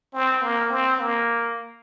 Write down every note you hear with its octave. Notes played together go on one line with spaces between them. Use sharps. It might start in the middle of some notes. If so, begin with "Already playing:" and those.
C4
A#3
C4
A#3